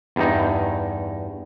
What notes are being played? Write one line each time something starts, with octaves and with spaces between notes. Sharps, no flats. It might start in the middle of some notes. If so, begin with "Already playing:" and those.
E2 G2 D#4